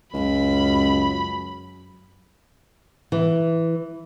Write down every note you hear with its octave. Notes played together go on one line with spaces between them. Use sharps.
C#2 F#2 B5
E3